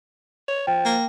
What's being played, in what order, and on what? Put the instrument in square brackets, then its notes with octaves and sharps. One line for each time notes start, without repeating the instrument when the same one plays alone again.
[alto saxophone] C#5
[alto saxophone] F3 [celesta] G5
[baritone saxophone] A#3